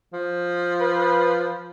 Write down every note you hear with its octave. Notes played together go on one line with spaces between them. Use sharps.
F3
B4